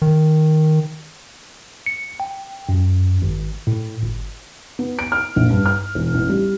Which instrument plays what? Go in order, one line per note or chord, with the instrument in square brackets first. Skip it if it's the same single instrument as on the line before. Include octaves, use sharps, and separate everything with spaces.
[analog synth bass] D#3
[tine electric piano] C#7
G5
F#2
G#1
A2
G1
[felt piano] B3
D7
F6
A#1
G2
F6
E1
A1
G3